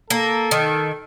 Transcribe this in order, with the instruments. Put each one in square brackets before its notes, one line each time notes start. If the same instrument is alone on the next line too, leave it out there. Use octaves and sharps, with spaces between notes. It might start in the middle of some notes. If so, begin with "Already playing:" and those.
[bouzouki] A#3 [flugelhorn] A4
[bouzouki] D#3